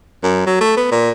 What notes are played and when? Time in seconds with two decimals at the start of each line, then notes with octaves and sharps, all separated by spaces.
0.23 F#2
0.46 F#3
0.61 A3
0.77 B3
0.91 A#2